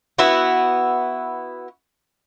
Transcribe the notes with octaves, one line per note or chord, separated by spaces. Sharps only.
B3 E4 F#4